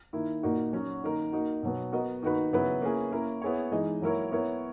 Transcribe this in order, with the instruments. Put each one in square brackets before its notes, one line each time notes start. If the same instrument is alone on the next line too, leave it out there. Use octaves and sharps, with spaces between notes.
[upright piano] D#3 A#3 E4
A#2 A#3 D#4 F#4
F#3 C#4 F#4
D#3 A#3 D#4 A#4
A#3 D#4 F#4
B2 F#3 B3
B3 F#4 A#4 D#5
D#3 A#3 D#4 F#4 B4
C#3 F#3 B3 E4 B4
A#3 C#4 E4 G#4 B4
A#3 C#4 E4 A#4
B3 E4 G#4 C#5
E3 G#3 D#4 G#4 D#5
F#3 A#3 E4 A#4 C#5
B3 E4 A#4 C#5